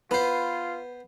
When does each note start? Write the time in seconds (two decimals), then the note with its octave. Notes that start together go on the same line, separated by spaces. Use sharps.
0.11 B3 F4 B4 C5